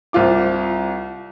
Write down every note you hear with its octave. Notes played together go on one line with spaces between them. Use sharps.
C2 C4 F4 D6